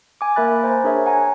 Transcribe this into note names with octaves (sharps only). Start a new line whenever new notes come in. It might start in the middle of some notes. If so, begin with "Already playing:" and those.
G#5 D6
A#3 A#4 E5 B5 F#6 A6
C5 G#5 A#5
D4 G#4 A#4 C#5 E5
F#5 G#5 A#5